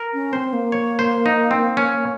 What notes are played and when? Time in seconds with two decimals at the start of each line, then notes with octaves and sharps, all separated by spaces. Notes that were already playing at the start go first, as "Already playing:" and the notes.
Already playing: A#4
0.14 C#4
0.33 C4 C5
0.53 A#3
0.72 C#5
0.99 C5
1.26 D#4
1.51 C4
1.77 C#4